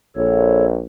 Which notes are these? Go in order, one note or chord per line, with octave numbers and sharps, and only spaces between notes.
A#1 A4 C#5